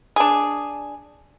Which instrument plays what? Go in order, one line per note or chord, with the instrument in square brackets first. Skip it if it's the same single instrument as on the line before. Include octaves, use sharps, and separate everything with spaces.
[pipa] D4 G#4